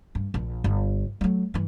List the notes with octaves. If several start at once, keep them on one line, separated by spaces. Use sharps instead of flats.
G2
A#1
G1
F#3 A3
G2 E3